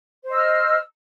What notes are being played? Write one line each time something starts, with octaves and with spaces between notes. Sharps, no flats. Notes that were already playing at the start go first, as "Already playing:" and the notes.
C5 D#5 E6 F6